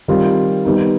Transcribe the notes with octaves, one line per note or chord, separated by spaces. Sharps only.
D#3 G3 C4 F4
D#3 G3 B3 D#4